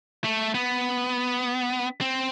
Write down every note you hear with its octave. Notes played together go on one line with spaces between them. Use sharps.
A3
B3
C4